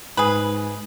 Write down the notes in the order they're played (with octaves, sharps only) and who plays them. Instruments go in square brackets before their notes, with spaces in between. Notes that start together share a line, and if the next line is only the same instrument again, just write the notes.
[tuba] G#2 [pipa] G#4 B4